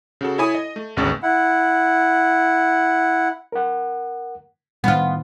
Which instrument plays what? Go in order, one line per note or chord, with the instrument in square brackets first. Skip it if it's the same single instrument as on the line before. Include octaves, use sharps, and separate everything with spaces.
[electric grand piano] C#3 F#4 A4
E4 A4 C#5 G#5 B5 D#6
D#5
A3
G#1 D2 C#3 B3 C#6 A6
[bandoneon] E4 F#5
[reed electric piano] A#4 F#5
[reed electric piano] A2 D#3 [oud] B3 F4